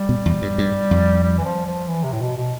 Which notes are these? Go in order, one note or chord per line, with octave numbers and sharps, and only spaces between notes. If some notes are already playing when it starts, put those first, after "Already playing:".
Already playing: G3
B2
E2
G2
G2
F2
G3
E3
F3
F3
E3
C3
A2
B2
B2